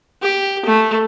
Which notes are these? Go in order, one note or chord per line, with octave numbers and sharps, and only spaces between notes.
G4
A3